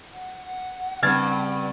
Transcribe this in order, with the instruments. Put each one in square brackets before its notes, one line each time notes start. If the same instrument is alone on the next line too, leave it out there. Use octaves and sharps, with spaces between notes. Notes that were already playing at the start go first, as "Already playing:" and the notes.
[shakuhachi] F#5
[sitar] G2 [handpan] C#3 G3 C4 [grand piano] F6 G#6 A6